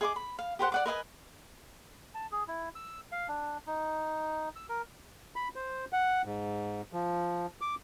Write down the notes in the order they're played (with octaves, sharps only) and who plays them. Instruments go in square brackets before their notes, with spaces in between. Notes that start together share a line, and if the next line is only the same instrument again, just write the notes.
[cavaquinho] G#4 D#5 C#6 D6
B5
F5
G4 A#4 C5 F#5
D5 F#5 D6
A#4 B4 D#5 G#5
[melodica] A5
G#4
E4
E6
F5
D4
D#4
E6
A#4
[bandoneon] B5
C5
F#5
G#2
F3
D6